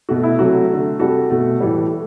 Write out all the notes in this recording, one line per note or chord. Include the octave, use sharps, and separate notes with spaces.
B2 A3 F#4
E4
C3 F#3 A3 F#4
D3 A3
C3 G3 F#4 A4
B2 A3
A2 E3 G3
A3